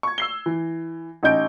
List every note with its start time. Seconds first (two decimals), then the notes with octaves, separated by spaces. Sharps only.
0.03 C#6 G#6
0.18 E6 C7 G7
0.46 E3
1.23 A1 D#4 D#5 G6 D7